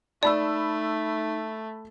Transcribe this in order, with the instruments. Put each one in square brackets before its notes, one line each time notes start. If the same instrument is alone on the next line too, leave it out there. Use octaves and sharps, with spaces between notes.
[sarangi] A3 [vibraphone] D#4 [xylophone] D5 [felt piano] A5 B5 E6